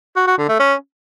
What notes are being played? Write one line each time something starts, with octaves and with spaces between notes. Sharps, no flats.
F#4
F#4
D3
A3
C#4